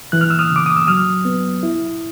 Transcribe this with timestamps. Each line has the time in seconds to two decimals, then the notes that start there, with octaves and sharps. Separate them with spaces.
0.12 E3 F#6
0.21 F6
0.30 E6
0.39 D#6 F6
0.50 C#3
0.56 D6
0.66 D#6
0.77 E6
0.87 F#3 D#6 F6
1.25 B3
1.63 E4